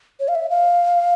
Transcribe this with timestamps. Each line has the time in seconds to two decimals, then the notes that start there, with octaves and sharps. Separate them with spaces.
0.20 C#5
0.28 F5
0.35 E5
0.50 F5